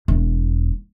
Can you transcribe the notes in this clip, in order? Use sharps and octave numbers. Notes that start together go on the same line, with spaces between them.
E1 E2